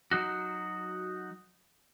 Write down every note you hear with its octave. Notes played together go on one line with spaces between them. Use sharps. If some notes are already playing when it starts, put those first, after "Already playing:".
F#3 D#4 F#4